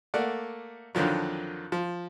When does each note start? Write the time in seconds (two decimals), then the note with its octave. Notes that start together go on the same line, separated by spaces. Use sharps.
0.14 A3 A#3 D5 F#5
0.95 F2 D3 D#3 F3 F#3
1.72 F3